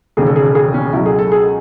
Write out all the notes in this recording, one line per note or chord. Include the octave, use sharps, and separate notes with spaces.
E1 D#2 C#3 G#4
A4
G#4
A4
G#4
C#4
C#2 B2 F#3 E4
G#4
A4
G#4